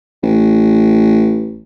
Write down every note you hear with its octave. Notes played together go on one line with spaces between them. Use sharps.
A1